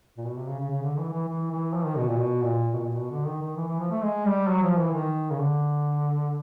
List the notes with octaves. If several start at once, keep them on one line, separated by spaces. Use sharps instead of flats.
A#2
B2
C3
C#3
C#3
C#3
D3
E3
E3
E3
E3
F3
D#3
B2
A#2
B2
A#2
B2
A#2
B2
D3
D#3
D#3
E3
E3
F3
A3
G#3
G3
F#3
F3
E3
D#3
C#3
D3